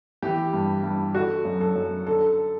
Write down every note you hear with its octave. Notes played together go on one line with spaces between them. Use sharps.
E3 G4
G2
G2
D3 F#4
F#2
A4
F#2
D3 A4